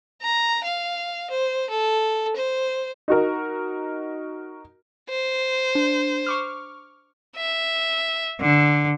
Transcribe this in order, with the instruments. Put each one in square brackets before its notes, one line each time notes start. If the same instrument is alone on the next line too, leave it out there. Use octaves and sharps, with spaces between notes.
[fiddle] A#5
F5
C5
A4
C5
[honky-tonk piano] D#4 F#4 A#4
[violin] C5
[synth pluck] D4
C#6 D6 F6
[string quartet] E5
D3